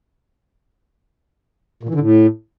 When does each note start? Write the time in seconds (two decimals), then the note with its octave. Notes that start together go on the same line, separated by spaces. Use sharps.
1.83 A#2
1.89 E3
1.95 D3
2.00 A2